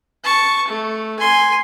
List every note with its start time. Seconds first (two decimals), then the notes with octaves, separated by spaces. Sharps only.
0.24 A5 C#6
0.68 A3
1.19 G#5 C6